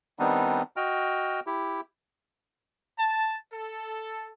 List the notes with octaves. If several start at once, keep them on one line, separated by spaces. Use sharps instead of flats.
D#3 G3 B3 C4 D4 D#4
F#4 D#5 G5 F6
E4 G4
A5
A4